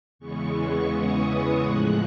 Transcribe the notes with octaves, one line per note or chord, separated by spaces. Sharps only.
E2 C#3 E3 G#3 B3 C#6
D#6
A2 F3 G#3 F#6